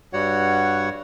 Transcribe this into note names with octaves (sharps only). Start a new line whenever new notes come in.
G2 G3 F#4 C#5 F#5